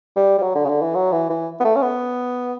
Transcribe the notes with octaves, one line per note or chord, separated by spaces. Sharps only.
G3
G3
F#3
D3
C#3
D3
E3
F#3
E3
E3
B3
A3
C#4
B3